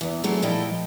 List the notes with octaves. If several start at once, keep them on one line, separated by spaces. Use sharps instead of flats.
E2 E3
F#3 A3 C4 E4 G#4
A#2 F3 A3 E4 D#5 G5